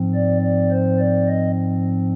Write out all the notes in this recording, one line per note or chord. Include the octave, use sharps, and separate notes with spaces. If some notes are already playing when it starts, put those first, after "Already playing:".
Already playing: G#2 F3 C4
D5
D5
C5
D5
D#5